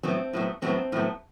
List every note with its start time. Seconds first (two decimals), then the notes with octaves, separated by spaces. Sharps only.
0.03 A2 F#3 B3 C4
0.33 A2 F#3 B3
0.62 A2 F#3 B3 C4
0.92 A2 F#3 B3